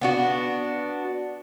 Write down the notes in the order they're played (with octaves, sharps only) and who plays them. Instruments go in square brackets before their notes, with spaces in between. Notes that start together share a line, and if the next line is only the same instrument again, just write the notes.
[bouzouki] B3 D4 F#4